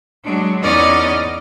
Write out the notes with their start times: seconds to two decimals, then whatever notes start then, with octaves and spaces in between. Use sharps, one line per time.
0.24 F#3 G#3 D4
0.60 E2 C#4 D#4 D5 D#5 F6